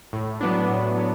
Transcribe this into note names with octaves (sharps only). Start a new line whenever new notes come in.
A2
F#3 B3 D4
A2
F#3 B3